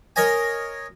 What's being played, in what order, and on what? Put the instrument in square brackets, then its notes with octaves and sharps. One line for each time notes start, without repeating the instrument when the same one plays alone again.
[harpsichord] A#4 C#5 D#5 G#5